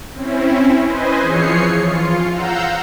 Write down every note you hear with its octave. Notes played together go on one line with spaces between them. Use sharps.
C4 C#4 E4
B4 C5 D#5 G#5
E3 F3 G#4 C#5 C7 C#7
F4
F5 F#5 A#5 E6 G6